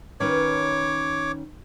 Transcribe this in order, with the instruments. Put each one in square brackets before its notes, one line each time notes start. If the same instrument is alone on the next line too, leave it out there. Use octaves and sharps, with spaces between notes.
[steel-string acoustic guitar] D#3 C#4 B4 [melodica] C#5 D6